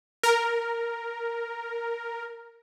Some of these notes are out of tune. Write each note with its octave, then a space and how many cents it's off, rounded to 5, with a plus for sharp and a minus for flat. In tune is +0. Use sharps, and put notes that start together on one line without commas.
A#4 +0